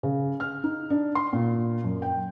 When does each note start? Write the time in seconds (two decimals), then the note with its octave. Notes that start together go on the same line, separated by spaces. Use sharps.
0.03 C#3
0.40 F6
0.64 D#4
0.90 D4
1.15 C6
1.33 A#2
1.84 F#2
2.02 G5